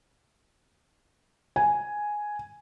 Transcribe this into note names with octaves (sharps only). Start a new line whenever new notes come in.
G#5